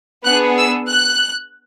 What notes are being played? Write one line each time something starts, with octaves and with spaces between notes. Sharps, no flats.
B3 D4 G#4 F#6
E6
F#6